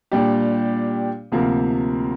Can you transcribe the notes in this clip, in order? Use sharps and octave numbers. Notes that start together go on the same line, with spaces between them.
A#2 G3 D4 G4
D2 C3 F3 A#3